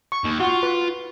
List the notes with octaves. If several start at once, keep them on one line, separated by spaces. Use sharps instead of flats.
C#6
D#2
F4 F#4 C#6
B4